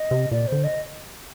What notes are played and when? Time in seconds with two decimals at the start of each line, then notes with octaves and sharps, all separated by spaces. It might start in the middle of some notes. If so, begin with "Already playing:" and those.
Already playing: D#5
0.11 C3
0.31 A#2 D5
0.48 D3 C5
0.64 D#5